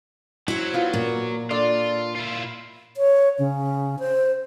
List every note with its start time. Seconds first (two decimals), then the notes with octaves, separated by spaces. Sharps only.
0.48 F#3 E4 C5
0.73 B3 F4 B4
0.93 A#2
1.51 D4 F4 A4 D5
2.16 E4 F4
2.97 C#5
3.39 C#3
3.99 C5